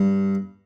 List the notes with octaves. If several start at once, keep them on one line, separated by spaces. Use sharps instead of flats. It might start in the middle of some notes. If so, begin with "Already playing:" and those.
Already playing: G2